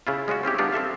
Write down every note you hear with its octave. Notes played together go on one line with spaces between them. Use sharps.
C#3 E4 F4
G#3 C#4 F4 F#4
C4 C#4 E4 G4
G3 B3 D4 D#4 F4 D5
C4 A4 E5 F5